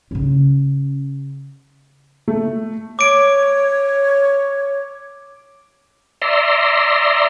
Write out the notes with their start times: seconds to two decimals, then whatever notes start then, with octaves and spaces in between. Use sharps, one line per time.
0.11 C#3 C#4
2.28 A3
2.99 C#5 D6 D7
6.22 D5 E5 A#5 C6